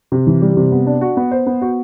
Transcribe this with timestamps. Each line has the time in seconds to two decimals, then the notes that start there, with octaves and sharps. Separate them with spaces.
0.12 C3
0.27 E3
0.42 G3
0.57 C3
0.72 B3
0.87 D4
1.01 F#4
1.17 B3
1.31 C5
1.47 B3
1.61 F#4